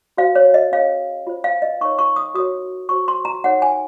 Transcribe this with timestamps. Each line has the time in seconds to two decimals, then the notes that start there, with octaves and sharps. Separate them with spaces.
0.17 F#4 C5 F5
0.35 C#5
0.54 D#5
0.72 C#4 G#4 C#5 F5
1.27 F4 C5
1.44 F5
1.62 D#5
1.81 D#4 A#4 C#5 C#6
1.99 C#6
2.16 D#6
2.34 F#4 A#4 C#5 D#6
2.89 F#4 C5 C#6
3.08 C6
3.25 A#5
3.44 D#4 A#4 C#5 F#5
3.62 G#5